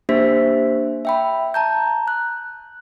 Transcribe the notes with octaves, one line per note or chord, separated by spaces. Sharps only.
A#3 D4 G4 C5 E5 B6
E5 G5 B5
A5 A#5 G6
F#6